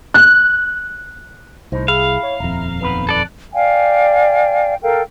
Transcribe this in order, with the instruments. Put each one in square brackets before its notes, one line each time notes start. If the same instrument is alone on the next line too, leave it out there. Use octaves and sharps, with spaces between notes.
[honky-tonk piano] F#6
[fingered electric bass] C2 [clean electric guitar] A2 D#4 [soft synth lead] C5
[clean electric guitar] E4 [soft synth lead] G#4 [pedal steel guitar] F5
[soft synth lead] C#5
[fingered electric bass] D#1 F2 [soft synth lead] A#5
[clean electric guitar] B1 D#3 B4 [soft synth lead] B3
[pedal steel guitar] A4 D5 [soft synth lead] F#6
[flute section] D5 F5 G5 G#5
A4 A#4 F5 G5